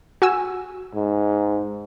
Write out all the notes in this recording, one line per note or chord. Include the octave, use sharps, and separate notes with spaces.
F#4 G#5 E6
G#2